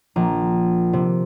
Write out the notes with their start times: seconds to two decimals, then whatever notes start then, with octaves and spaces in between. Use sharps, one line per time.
0.16 A#1
0.93 C3